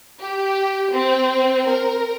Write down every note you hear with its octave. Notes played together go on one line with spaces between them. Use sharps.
G4
C4
A#4